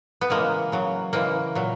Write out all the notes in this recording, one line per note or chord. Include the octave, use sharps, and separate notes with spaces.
B3
C#3 E3 G#3 A#3
C#3 F#3
C#3 E3 G#3 A#3
A#2 F#3